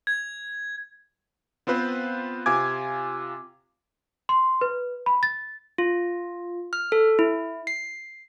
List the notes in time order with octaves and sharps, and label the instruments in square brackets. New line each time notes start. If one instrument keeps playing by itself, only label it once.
[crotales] G#6
[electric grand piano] B3 C4 F4 B4 C5
C3 F4 G#5 D6 G#6
[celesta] C6
B4
B5
A6
[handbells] F4
F6
A4
E4
C7